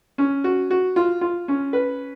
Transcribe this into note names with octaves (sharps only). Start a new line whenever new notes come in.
C#4
F#4
F#4
F4
F4
C#4
B4